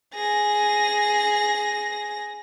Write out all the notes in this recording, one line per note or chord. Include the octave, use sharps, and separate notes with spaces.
G#4 A#6